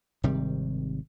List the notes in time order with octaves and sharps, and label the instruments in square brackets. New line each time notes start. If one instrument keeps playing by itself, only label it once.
[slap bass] G#1 C3 D#3 G3